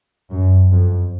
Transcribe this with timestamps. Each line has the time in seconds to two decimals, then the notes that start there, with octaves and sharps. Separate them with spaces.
0.31 F#2
0.71 F2